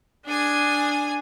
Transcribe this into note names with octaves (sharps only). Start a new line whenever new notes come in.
D4 G#4 G#5